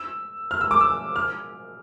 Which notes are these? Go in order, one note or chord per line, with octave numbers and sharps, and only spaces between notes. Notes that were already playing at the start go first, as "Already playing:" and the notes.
Already playing: E6
F6
E6
D6
E6
F6